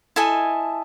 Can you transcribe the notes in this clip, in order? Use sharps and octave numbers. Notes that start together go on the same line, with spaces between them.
E4 A4 D#5 G#5